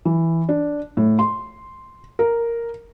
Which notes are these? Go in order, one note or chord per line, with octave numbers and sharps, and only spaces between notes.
E3
D4
A2
C6
A#4